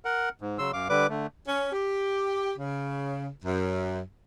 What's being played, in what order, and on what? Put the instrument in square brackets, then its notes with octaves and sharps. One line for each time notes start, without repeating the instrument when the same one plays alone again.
[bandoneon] A#4 F#5
G#2
C#3 F#3 C6 E6
F#2 F5 D6
D3 G3 B4 D6
D3 A3
[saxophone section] C#4
G4
C#3
F#2